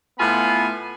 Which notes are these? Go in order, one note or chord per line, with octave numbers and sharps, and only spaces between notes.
A2 B3 F4 G#5 B5